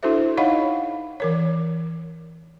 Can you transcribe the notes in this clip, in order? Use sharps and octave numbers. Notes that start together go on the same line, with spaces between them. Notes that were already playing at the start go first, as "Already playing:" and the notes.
D4 E4 F#4 A4 C5 E5
D#4 C#5 D#5 F5 F#5 B5
E3 A#4 C#5